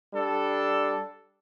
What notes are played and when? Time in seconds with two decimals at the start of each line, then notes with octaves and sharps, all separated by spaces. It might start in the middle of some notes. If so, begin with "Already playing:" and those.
0.13 G3 D4 A4